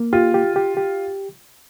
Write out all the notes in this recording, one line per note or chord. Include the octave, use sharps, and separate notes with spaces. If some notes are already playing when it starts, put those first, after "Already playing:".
Already playing: A#3
F4 G4
G4
G4
G4